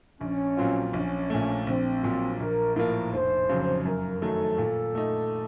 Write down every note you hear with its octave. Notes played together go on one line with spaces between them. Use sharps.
A#1 C#4
A#2 F#3 C4 F4
A#1 C#4
A#2 A3
A#1 C4
A#2 F#3
A#1 A#4
A2 F3 A#3 A#4
F1 C5
F2 C#3 F#3
F#2 A#4
D#3 F#3 A3 A4
A#2
A3 D#4